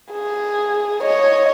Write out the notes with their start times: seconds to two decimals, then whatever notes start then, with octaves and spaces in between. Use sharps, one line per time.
0.12 G#4
1.03 C#5 D#5